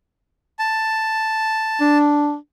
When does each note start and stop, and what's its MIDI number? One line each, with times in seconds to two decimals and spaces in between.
0.59 1.98 81
1.81 2.36 62